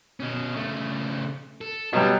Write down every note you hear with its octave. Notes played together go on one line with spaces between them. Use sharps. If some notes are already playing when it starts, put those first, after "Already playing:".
B2 C#4
C#3 A3
A4
B2 F#3 G3 F4 A4